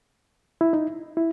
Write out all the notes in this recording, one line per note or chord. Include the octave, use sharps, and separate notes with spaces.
E4
D#4
E4